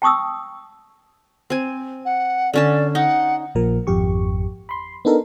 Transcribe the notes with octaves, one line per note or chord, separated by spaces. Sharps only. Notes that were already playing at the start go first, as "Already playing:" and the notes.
G5 A5 C#6 D#6 E6
C4 G#5
F#5
D3 C#4 D5 A5
D#4 F#5
A#1 A#2 F3 A#4
G#1 F2 G4 C#6
B5 C6
B3 D4 D#4 A4 A#4